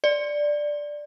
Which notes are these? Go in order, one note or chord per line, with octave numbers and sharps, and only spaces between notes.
D5